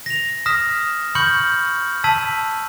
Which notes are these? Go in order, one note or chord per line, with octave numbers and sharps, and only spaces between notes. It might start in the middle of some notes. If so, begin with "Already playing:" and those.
A#6 F7
D#6 F6 A#6 B6 E7
B5 C#6 F6 G6 C#7 F#7
A5 E6 G#6 B6 D#7 F#7